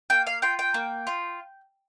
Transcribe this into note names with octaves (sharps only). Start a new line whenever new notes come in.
A#3 G5
F5
F4 G5
G5
A#3
F4